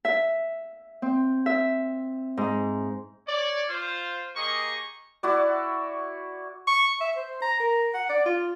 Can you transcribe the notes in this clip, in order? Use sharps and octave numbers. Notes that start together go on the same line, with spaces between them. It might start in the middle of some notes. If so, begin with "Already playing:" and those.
E5
C4
E5
G#2
C#5 D5
F4 C5
A#3 G4 G#4 D#5 C#6
E4 F#4 D5
C#6
E5
C5
A#5
A#4
F#5
D5
F4